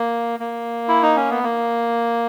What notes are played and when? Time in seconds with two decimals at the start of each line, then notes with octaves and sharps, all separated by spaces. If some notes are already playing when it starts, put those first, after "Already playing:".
Already playing: A#3
0.40 A#3
0.88 E4
1.02 D#4
1.16 C#4
1.31 B3
1.44 A#3